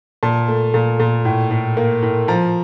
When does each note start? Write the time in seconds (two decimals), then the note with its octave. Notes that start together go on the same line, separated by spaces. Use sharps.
0.23 A#2 A5
0.48 A3
0.74 A#2
1.00 A#2
1.25 A2
1.51 A2
1.77 A#3
2.02 A2
2.28 F3 A#5